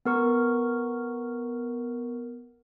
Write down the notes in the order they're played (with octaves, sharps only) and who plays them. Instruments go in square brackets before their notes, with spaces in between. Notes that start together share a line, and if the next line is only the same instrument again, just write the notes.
[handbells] B3 A#4 C#6